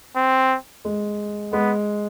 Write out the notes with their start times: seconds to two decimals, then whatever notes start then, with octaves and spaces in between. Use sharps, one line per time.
0.16 C4
0.85 G#3
1.53 G#3 B3